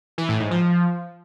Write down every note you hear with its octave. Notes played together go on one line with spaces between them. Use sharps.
E3
A2
G#2
F3